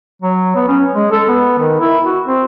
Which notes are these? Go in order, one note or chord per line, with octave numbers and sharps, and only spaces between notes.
F#3
B3
C#4
G#3
A4
B3
D#3
E4
F#4
C4